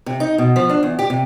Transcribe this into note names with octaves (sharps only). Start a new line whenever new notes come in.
C3
D#4
B2
F3
D4
E2
G4
C3